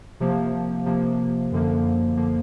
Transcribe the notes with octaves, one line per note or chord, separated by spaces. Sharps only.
C3 F3 A#3
C3 F3 A#3
F#2 D3 F3 A#3
D3 F3 A#3